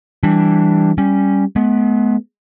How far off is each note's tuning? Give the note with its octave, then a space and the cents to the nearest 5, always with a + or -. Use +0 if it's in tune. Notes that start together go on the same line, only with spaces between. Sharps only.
E3 +0 G3 +0 D4 +0
G3 +0 C#4 +0
G#3 +45 B3 +0